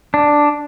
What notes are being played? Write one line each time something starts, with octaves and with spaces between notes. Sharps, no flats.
D4